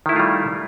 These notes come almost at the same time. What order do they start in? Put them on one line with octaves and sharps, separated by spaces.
D#3 E4 A3 F4 G3